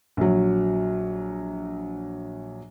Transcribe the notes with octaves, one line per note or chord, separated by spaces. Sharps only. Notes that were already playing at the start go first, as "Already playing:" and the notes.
A#1 F#3